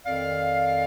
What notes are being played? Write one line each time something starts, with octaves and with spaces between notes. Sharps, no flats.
F2 D#3 D5 F5